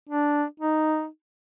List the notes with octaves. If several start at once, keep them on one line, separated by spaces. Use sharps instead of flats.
D4
D#4